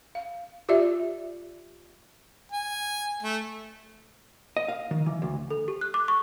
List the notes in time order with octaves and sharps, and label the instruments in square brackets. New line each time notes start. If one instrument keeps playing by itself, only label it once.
[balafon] F5
F4 G4 D5 E5
[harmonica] G#5
A3
[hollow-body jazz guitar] D#5
F5
D#3
E3
D2
[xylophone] A4
G4
F#6
D6
C#6